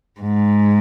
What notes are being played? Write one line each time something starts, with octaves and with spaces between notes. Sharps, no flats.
G#2